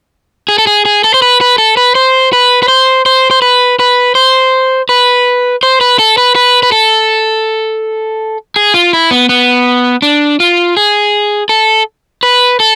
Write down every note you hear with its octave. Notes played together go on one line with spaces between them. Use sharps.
G#4
A4
G#4
G#4
A4
C5
B4
B4
A4
B4
C5
B4
B4
C5
C5
C5
B4
B4
C5
B4
C5
B4
A4
B4
B4
B4
A4
G#4
F4
E4
B3
B3
D4
F4
G#4
A4
B4
A4